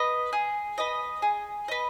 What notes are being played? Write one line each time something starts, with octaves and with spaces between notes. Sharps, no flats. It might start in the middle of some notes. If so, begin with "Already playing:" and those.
Already playing: B4 D#5
G#4
B4 D#5
G#4
B4 D#5